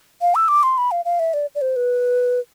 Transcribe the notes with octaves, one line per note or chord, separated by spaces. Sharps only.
F5
E6
D6
C6
B5
F5
F5
E5
D5
D5
C5
B4